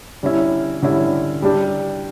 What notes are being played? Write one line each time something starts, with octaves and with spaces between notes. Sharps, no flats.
D3 G3 C#4 E4
D3 G3 C#4 E4
G3 D4 G4